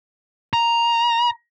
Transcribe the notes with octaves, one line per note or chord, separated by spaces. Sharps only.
A#5